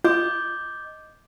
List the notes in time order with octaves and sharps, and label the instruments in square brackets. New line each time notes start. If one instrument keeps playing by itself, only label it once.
[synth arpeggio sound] F4 [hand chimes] D#5 D6 G6